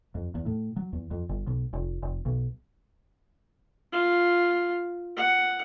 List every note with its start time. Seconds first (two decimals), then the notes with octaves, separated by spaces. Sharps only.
0.15 F2
0.35 E2
0.46 A2
0.76 F#3
0.93 E2
1.11 F2
1.29 G1
1.47 B1
1.73 F1
2.02 F1
2.25 B1
3.92 F4
5.16 F#5